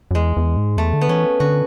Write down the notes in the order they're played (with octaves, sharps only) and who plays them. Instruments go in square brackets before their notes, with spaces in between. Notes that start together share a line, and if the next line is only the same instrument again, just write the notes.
[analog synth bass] F#2
[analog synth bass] E2 [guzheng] G#3
[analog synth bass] E2
G#2
[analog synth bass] E2 [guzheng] A3
[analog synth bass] D3
[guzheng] B3
[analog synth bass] E3 [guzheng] C#4
[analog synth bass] D3 [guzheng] F#4